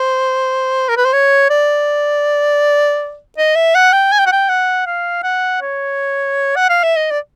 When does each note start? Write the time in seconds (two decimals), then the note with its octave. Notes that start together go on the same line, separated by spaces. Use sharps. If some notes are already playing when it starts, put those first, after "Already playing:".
Already playing: C5
0.89 A#4
0.97 B4
1.05 C5
1.13 C#5
1.50 D5
3.38 D#5
3.56 E5
3.75 F#5
3.92 G5
4.12 G#5
4.19 G5
4.26 F#5
4.32 G5
4.49 F#5
4.86 F5
5.23 F#5
5.62 C#5
6.56 F#5
6.69 F5
6.83 E5
6.96 D#5
7.11 D5